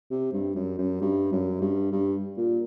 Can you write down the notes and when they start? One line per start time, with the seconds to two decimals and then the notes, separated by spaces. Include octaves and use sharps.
0.11 C3
0.33 G2
0.55 F#2
0.78 F#2
1.01 G2
1.32 F#2
1.61 G2
1.92 G2
2.37 A#2